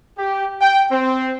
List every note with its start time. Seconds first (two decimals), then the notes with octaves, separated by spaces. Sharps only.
0.18 G4
0.60 G5
0.91 C4